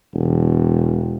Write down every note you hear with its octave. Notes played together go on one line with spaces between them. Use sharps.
E1